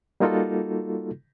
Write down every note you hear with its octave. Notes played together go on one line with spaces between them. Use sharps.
G3 A#3 D#4 F4 F#4 A4